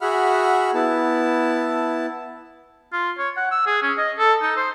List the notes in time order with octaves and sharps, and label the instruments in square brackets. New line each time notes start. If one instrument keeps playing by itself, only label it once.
[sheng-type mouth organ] F#4 G#4 E5 F#5 B5 F6
B3 E4 A5
[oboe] F4
C#5
F#5
E6
G#4
C#4
D#5
A4
D#4
C5